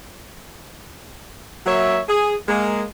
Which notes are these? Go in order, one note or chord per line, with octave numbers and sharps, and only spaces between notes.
F#3 A#3 C#5 E5
G#4
G#3 A#3